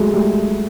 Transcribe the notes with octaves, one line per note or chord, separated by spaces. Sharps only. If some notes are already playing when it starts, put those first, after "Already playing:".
Already playing: F#3 G#3 A3
G3 A3